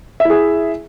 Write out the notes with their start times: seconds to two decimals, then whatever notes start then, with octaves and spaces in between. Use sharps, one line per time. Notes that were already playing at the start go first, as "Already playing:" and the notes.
0.20 E5
0.25 E4
0.30 G#4